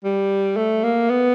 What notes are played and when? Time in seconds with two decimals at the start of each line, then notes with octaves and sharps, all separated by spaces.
0.04 G3
0.57 A3
0.84 A#3
1.09 B3